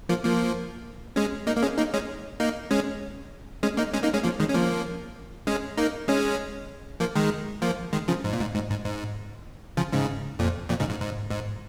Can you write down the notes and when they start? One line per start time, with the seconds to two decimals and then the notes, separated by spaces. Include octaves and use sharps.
0.09 F3 A#3
0.24 F3 A#3
1.16 G#3 C#4
1.47 A#3 D#4
1.57 A#3
1.63 G#3 C#4
1.78 A#3 D#4
1.94 G#3 C#4
2.40 A#3 D#4
2.71 G#3 C#4
3.63 G#3 C#4
3.77 A#3 D#4
3.94 G#3 C#4
4.03 A#3 D#4
4.14 G#3 C#4
4.23 F3 A#3
4.40 D#3 G#3
4.49 C#4
4.54 F3 A#3
5.47 G#3 C#4
5.77 A#3 D#4
6.08 G#3 C#4
7.00 F3 A#3
7.15 D#3 G#3
7.62 F3 A#3
7.93 D#3 G#3
8.08 C#3 F3
8.24 G#2
8.33 A#2
8.41 G#2
8.54 G#2
8.70 G#2
8.85 G#2
9.77 C#3 F3
9.92 G#2 C#3
10.39 F2 A#2
10.69 F2 A#2
10.80 G#2 C#3
10.90 G#2
11.01 G#2
11.30 G#2